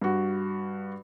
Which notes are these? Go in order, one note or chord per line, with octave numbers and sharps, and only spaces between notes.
G2 F#4